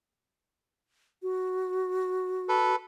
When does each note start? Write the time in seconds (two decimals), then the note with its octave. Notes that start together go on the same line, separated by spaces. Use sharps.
1.22 F#4
2.49 A4 B4